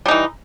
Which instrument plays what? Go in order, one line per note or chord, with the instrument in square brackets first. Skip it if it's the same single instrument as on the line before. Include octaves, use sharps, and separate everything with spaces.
[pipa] G3
D#4
E3